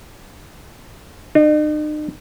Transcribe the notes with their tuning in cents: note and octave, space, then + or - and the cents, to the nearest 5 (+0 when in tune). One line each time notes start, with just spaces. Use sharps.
D#4 -45